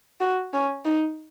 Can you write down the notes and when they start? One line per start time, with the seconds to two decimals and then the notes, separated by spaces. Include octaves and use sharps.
0.21 F#4
0.53 C#4
0.85 D#4